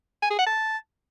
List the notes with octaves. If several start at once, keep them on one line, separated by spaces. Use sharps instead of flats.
G#5
G#4
F#5
A5